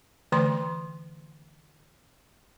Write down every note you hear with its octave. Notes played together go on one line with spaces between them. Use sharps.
D3 E3 A3 C6